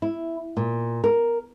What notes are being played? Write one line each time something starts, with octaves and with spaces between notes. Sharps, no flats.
E4
A#2
A#4